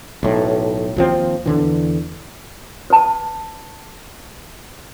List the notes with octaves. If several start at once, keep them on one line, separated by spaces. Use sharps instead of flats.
B1 A2
D#2 F3 C4
E2 D3 E3
B4 A5